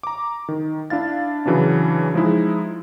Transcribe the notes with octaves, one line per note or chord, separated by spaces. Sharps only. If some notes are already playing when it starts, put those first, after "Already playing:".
A#5 D6
D#3
D4 E4 F5 A6
C#3 E3 F#3 C#4 D4
F3 G#3 D#4 E4